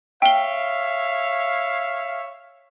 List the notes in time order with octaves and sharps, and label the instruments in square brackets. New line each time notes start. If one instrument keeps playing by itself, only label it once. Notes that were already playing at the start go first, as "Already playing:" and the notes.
[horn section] C#5 E5 F5 [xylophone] G5 G7